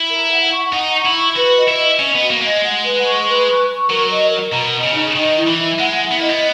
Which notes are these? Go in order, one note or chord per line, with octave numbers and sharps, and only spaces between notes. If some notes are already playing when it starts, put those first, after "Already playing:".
Already playing: E4
A#4
F#5
C#6
D#4 F#5
C#6
E4
C#6
F#4 B4
D#5
E4
D#5
C#4 D#5
B3
F#4
A#3
A#3 D#5
G#3
F#5
B4
C#6
B4
C#6
C#6
F#3 A#4
D#5
A#4
B2 A#5
D#5
C#3
D#4
D#3 D#5
E4
E3
E4
G#3 F#5
E4
B3
A#3 D#5
B3